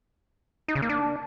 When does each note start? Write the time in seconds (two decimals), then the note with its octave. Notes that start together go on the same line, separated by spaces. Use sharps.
0.68 D#4
0.75 C#3
0.82 A#3
0.89 D4